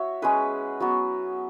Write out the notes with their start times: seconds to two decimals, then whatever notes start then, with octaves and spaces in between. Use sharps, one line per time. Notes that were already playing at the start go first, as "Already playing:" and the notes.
Already playing: F#4 C#5 E5
0.22 G#3 C#4 G#4 B4
0.80 F#3 B3 F#4